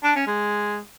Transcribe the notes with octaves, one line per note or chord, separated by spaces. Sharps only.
D4
C#4
G#3